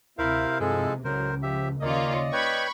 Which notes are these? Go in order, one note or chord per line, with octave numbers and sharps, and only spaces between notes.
D2 C3 E4 A#4 C5 F5
G2 F3 G#3 D#4 E4 G#4 A4
C#2 A2 C#3 F#3 A#4 C5
F3 G4 E5
D#2 A#3 C#4 F4 D5 D#5
B4 C#5 G5 B5 C#6